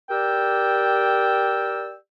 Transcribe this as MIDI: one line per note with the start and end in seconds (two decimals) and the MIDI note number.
0.10 1.95 67
0.10 1.95 70
0.10 1.95 74
0.10 1.95 79
0.10 1.95 88